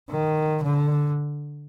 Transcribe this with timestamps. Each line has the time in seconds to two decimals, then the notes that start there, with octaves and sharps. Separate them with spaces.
0.10 D#3
0.63 D3